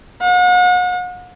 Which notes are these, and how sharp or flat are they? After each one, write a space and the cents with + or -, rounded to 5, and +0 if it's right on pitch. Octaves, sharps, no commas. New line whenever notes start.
F#5 -40